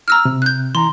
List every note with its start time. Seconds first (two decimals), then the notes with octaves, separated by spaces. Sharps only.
0.08 A#5 E6 F6
0.25 C3
0.42 F#6 G6
0.75 E3 A#5 C6